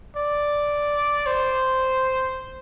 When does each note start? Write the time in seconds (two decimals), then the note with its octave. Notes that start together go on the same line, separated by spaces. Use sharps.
0.16 D5
1.26 C5